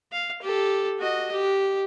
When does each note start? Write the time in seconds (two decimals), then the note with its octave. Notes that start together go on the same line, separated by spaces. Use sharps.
0.12 F5
0.42 G4 A4
0.99 F#4 D#5
1.32 G4